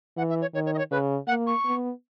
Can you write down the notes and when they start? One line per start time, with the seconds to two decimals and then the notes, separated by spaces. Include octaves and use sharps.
0.17 E3 F#5
0.30 E5
0.41 C#5
0.54 D#3 C#5
0.66 C#5
0.74 D#5
0.78 C#5
0.91 C#3 B4
1.27 A#3 F#5
1.47 C#6
1.65 B3